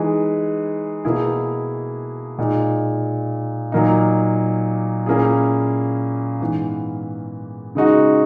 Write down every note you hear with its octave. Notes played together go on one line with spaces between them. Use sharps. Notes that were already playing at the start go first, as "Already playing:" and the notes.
Already playing: E3 G#3 D#4 G#4
B2 A#3 E4 G#4
A#2 G#3 D#4
A#2 F#3 A#3 D#4
A#2 A#3 C#4 E4 G#4
G#2 E3 B3
C#3 G#3 D#4 F#4